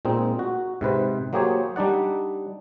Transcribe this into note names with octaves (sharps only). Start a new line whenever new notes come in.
A#2 G#3 C4 D#4
F#4
G#2 C3 B4 C5
F#3 A#3 G4 G#4 C5 C#5
G3 D4 D#4 D5 F#5